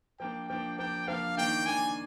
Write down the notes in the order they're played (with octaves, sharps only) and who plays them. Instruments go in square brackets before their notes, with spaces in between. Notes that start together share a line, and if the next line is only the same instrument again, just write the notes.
[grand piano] F3 A#3 D4 [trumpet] G5
[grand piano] F3 A#3 D4 [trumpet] G5
[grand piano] F3 A#3 D4 [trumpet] G5
[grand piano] F3 A#3 D4 [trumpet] F5
[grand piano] D#3 A#3 D4 [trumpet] G5
[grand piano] D#3 A#3 D4 [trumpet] G#5